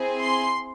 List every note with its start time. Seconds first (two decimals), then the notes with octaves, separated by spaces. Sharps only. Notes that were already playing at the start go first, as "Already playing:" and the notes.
Already playing: C4 E4 G#4
0.20 C6